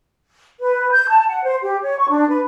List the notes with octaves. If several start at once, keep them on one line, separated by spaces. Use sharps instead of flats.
B4
G6
A5
F#5
C5
G4
C#5
C#6
D4
B4